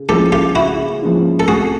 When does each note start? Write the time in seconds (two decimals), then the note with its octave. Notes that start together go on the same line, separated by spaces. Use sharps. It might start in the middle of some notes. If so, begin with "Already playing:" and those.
Already playing: C#3
0.09 F3 G#3 C#4 E4 G4 A4
0.32 F4 G4
0.55 C#3 E4 F#4
1.02 F3 G#3 C#4 E4
1.40 A4
1.47 C3 F#4 G#4